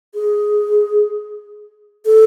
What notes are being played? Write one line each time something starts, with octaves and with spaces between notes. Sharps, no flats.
G#4
A4